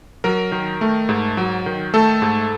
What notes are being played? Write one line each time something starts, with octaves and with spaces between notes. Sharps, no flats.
F#3 A#4
D#3
A3
G#2
F#3
D#3
A3 A4
G#2